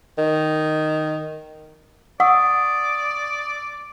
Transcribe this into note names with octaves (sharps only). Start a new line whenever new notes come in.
D#3
D5 F#5 C#6 D#6 E6